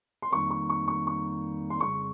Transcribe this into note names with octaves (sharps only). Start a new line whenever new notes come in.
C6
F2 D#3 G3 A#3 D#4 C#6
C#6
C#6
C#6
C#6
C6
F2 C#3 G3 C#6